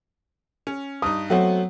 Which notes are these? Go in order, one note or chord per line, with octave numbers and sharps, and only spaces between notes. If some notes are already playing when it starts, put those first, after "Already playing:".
C#4
G2 D#4 D#6
F#3 A3 B3 C4